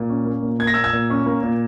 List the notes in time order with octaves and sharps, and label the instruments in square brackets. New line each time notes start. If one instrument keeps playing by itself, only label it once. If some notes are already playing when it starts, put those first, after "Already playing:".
Already playing: [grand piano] A#2
C#4
A#3
A#2
A#3 G#6
A#6
A#2 E6 G#6
E6 G#6
A#2
C#4
A#3
A#2